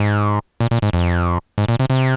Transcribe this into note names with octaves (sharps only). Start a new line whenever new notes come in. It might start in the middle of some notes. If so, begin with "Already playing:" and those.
Already playing: G#2
A#2
A#2
G#2
F2
G#2
A#2
C3
C3